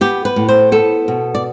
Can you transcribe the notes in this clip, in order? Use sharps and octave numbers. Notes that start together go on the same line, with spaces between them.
B3 G4
B4
A2
C5
B3 A4
B2
D5